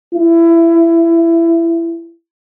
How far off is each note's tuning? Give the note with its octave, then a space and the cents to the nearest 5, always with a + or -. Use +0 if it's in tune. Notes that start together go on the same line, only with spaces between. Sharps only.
E4 +20